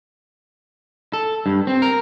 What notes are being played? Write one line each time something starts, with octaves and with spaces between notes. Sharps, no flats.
A4
G2
C4
A#4